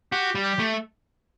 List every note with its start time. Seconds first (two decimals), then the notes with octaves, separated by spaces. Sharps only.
0.12 F#4 G4
0.35 G3
0.43 G4
0.59 A3